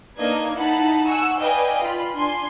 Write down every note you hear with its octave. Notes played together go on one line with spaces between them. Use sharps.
A#3 D4 D#4 B4 D#5 G#6
D#4 E4 F#5 A5 B5
F#5 G#5 C#6 E6
B4 D5 D#5 F5 G5 G#5
F4 B5
D4 G#5 C6